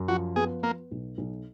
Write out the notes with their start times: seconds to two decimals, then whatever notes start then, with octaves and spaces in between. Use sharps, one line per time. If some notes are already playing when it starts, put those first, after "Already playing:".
Already playing: F#2
0.08 F3 F#4
0.36 B3 G#4
0.63 A#3 B3
0.91 B1
1.18 B1